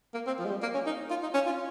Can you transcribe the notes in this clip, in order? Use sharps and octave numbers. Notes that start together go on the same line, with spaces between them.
A#3
C4
F3
G#3
G3
A#3
C#4
D#4
F4
D#4
C#4
F4